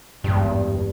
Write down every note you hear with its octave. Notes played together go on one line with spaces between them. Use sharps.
G#1 E2 G2